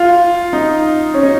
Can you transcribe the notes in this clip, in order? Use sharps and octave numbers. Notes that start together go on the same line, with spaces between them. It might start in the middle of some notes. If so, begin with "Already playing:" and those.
Already playing: F4
D#4
C#4
D#4